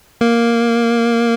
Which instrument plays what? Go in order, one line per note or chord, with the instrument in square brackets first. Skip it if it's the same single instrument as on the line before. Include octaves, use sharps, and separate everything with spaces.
[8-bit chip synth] A#3